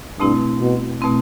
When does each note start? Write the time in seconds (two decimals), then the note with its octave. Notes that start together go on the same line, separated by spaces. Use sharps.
0.19 G2 B2 A3 C4 E4
0.61 B2
1.01 B2 A3 C4 E4